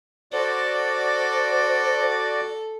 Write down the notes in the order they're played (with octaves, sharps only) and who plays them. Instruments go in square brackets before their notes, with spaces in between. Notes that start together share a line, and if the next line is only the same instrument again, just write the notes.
[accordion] F#4 D5 [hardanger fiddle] A4 [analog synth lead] C5